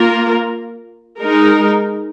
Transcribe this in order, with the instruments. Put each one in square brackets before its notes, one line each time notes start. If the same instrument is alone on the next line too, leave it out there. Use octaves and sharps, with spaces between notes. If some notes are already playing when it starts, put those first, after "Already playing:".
Already playing: [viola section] A#3 F4 A#4
G#3 D#4 A#4